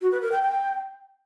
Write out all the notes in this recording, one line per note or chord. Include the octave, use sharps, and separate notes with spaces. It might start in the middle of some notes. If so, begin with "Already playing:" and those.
F#4
B4
A#4
G5
G5